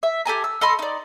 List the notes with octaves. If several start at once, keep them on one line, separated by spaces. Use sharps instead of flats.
E5
G4 A4 G#5 A#5
E6
A4 D#5 B5 C6
D#4 D5